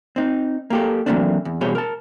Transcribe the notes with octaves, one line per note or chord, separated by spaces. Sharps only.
C4 D#4
A#3 G4 A4
E3 F#3 A3 A#3 C4 D4
E2
E2 B2 G3 G#4 C5 C#5
A#4 A5